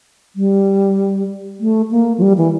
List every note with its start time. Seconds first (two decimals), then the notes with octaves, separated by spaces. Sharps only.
0.36 G3
1.60 A3
1.91 A#3
2.18 F3
2.22 G3
2.38 E3